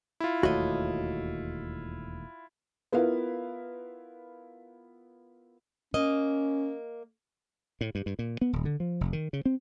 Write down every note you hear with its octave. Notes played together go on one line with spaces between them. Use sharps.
E4 F4
E1 D#2 A3 F#4 C#5 D#5
B3 E4 F4 A#4 B4 F5
A#3 C#4 D#5
A2
G2
G2
A#2
B3
D#1
D3
F3
F1
D#3
C#3
C4